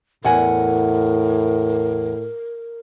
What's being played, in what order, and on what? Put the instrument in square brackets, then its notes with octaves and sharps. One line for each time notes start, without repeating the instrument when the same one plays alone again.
[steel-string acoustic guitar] E2 F#5 G#5 [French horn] A2 [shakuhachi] A#4